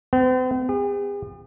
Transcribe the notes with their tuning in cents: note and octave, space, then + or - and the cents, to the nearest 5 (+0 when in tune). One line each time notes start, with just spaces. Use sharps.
C4 -45
G#4 -45